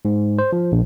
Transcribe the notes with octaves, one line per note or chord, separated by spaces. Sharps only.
G#2
C5
F3
A#1